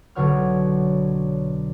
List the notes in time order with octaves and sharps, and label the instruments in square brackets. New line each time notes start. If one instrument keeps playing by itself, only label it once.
[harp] B1 B2 D3 C#5 F#5 F6